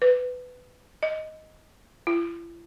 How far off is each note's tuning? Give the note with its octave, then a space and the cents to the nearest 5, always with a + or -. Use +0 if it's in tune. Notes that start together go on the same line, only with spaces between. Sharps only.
B4 +15
D#5 +10
E4 +45